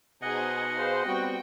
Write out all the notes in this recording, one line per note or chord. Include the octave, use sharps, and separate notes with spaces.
B2 D#4 G#4 C5 D#5 F#5
G#4 B4 C5 F5
G3 B3 C4 F#4 G5